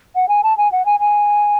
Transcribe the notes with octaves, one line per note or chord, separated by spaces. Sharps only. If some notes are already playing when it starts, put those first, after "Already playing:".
F#5
G#5
A5
G#5
F#5
G#5
G#5